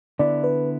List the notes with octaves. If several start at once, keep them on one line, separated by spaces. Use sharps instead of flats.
D3 B3 E4 D5
B4